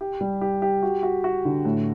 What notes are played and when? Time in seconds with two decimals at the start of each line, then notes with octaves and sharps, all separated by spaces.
0.01 G4
0.21 G3
0.41 G4
0.62 G4
0.83 F#4
1.03 F#4
1.24 F#4
1.45 D3
1.65 A2